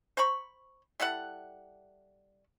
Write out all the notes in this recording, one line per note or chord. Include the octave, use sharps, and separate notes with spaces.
C5 A#5 B5 C#6
G3 E4 A4 F#5